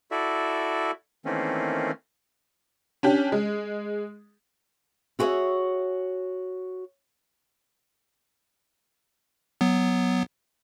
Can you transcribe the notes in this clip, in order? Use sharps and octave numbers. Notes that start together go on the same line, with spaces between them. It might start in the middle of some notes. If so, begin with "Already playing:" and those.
E4 F#4 A4 D5 E5
D#3 E3 A3 A#3 C4 C#4
C#4 D4 G4
G#3
E4 F#4 G#4 B4 C#5 E5
F#3 B3